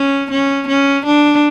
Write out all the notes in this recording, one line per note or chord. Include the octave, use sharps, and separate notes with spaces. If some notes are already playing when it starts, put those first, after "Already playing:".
Already playing: C#4
C#4
C#4
D4